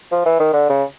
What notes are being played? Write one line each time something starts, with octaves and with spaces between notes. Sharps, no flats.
F3
E3
D#3
D3
C#3